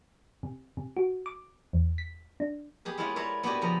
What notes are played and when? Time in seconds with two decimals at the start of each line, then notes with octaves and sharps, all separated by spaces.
0.43 C3
0.77 C3
0.97 F#4
1.26 D6
1.73 E2
1.98 B6
2.40 D4
2.85 B3 G4 G#4 B4
2.98 G#3 E4 F4 C#5 F#5
3.16 B4 C#5 D5 E5 A#5 C6
3.43 B3 D4 F#4 G4 D5 G#5
3.61 A#2 C#3 F3 B3 A#5